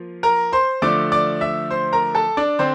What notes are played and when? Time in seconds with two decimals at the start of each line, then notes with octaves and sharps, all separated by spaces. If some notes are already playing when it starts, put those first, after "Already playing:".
Already playing: F3 A#3 F4
0.23 A#4 A#5
0.53 C5 C6
0.82 D3 F3 A3 D5 D6
1.12 D5 D6
1.41 E5 E6
1.71 C5 C6
1.93 A#4 A#5
2.15 A4 A5
2.37 D4 D5
2.59 D3 C4 C5